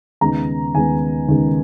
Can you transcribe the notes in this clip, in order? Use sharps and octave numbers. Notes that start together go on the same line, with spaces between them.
D#2 C#3 G#3 B3 D#4 A#5
D#2 C#3 G#3 B3 D#4 G#5
D#2 C#3 G#3 B3 D#4